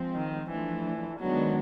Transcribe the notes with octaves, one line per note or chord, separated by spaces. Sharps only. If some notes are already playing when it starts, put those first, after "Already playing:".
Already playing: F3 G#3 C4
D#3
E3 F3 A3 D4
D#3 F#3 G#3 B3 D4